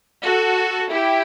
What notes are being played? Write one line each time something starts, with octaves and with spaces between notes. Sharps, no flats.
F#4 A4
E4 G4